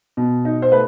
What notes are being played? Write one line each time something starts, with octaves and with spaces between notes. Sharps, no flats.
B2
D#4
C5
A3 B4